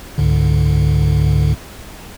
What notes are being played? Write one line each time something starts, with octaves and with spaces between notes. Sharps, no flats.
C#2 G#2 D3